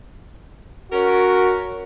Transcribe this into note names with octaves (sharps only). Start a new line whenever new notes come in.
C#4 F#4 A#4